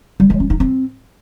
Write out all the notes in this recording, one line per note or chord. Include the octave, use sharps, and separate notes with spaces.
G3
G#3
C#4
D#4
C4